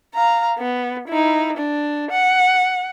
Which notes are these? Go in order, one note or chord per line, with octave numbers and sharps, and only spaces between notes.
F5 A#5
B3
D#4 E4
D4
F#5